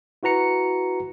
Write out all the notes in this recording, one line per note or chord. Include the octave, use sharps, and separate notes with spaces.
E4 F#4 B4 A#5 C#7